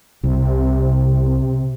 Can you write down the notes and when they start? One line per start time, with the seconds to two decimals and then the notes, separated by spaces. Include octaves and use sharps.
0.24 C2 C3